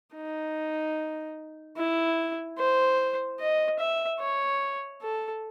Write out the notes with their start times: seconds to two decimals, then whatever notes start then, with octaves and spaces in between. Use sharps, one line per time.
0.15 D#4
1.78 E4
2.58 C5
3.40 D#5
3.79 E5
4.20 C#5
5.02 A4